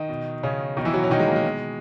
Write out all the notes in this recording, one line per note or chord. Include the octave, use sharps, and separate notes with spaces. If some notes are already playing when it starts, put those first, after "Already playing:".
Already playing: D#3 D#4
B2
C#3 C#4
B2 D#3 D#4
E3 E4
F#3 F#4
C#4
D#3 D#4
G#3
A#3
G#3
B2